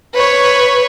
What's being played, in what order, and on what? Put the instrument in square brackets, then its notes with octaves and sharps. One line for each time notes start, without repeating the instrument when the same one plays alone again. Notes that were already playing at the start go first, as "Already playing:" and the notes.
[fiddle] B4 C#5